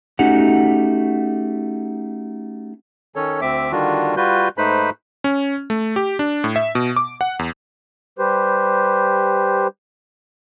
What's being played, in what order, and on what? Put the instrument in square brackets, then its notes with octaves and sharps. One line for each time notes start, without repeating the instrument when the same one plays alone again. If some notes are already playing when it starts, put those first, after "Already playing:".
[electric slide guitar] A3 C#4 D#4 F#4 G4 F#5
[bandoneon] D#3 C#4 A4 C#5
D2 C4 E5 D6
D3 D#3 G3 D4 F4 F#4
G3 F4 F#4 B4 G6
G#2 A3 D#4 B4 C5 B5
[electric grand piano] C#4
A3
G4
D4
A2
E5
B2
D6
F#5
E2
[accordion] G3 G4 B4 C5